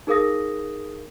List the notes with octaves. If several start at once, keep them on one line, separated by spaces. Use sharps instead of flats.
D#4 G#4 A#4 F5 D#6 A#6